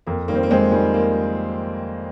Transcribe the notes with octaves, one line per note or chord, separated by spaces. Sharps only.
F2 A#3
D#3 G3 A#3
C4
A#3
F2 G#3 C4
D#3 G3 G#3
A#3